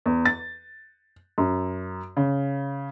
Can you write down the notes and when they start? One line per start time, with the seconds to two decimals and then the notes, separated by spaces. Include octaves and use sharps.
0.06 E2
0.25 A6
1.38 F#2
2.17 C#3